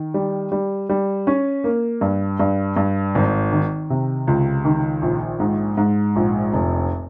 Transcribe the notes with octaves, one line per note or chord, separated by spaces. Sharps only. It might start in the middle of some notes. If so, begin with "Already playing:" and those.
Already playing: D#3
G3
G3
G3
C#4
A#3
G2
G2
G2
G#1
D#3
C3
C#2
D#3
A#1
G#2
G#2
A#1
F1